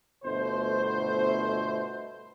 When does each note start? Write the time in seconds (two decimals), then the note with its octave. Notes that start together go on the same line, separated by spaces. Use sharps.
0.25 G1 B2 A3 C5